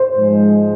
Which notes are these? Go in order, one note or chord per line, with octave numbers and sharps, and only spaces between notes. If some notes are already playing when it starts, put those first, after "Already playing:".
Already playing: C5
G#2 F3 G#3